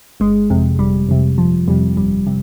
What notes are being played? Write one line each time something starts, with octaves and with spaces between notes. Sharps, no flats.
G1 G#3
F2 C3
G1 G3
F2 C3
G1 F3
F2 C3 G3
G1 G3
C3